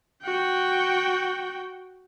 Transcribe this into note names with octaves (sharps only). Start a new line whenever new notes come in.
F#4 G5